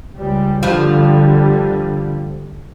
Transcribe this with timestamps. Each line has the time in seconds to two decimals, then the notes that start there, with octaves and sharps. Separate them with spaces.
0.14 C#2 G3
0.63 G2 D3 F3 G3